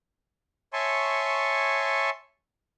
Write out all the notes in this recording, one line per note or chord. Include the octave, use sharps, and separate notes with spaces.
C#5 E5 G#5 A5 C6 C#6